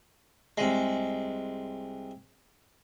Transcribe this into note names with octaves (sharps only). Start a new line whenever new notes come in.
C2 G#3